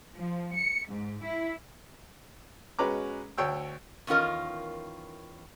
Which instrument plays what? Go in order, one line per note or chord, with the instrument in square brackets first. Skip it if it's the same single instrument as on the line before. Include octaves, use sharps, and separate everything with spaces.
[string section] F3
C#7
G#2
E4
[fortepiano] B2 G#3 C#4 B4 A#5 D6
D2 C#5 G5 E6
[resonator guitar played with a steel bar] E2 D#3 C#4 F4 A#4 D#5